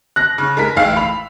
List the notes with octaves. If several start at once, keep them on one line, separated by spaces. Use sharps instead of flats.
F#6 A#6
C#3
G#3 A#4 B6
A1 G#3 F5 G5 E6
B5 F7